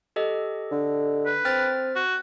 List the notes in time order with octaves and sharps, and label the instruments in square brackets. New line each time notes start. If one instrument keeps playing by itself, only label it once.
[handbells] G4 A4 D#5
[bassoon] D3
[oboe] B4
[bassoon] C4 [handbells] G5 F6 A6
[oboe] F#4